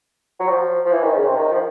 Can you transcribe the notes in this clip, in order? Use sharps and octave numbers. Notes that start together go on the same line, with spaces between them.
F#3
F3
F3
E3
D#3
C#3
C3
D#3
F3